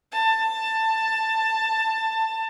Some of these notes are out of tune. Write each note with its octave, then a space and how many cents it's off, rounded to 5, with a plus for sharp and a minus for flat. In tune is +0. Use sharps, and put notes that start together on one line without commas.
A5 +15